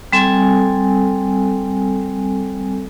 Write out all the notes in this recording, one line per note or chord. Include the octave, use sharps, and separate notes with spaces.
G3 C4 A4 G#5